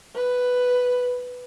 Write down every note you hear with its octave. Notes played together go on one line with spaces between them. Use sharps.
B4